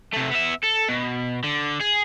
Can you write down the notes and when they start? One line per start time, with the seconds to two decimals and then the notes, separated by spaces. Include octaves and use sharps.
0.13 C3 A3
0.31 B3 E5
0.63 A4
0.88 B2
1.44 D3
1.81 G#4